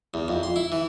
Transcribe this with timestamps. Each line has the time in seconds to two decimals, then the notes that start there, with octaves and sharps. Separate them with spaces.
0.14 E2
0.28 F2
0.43 C6
0.56 E4
0.72 E3